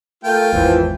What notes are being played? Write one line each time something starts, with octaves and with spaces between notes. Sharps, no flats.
A3 F4 A#4 G5
G#1 E2 E3 F3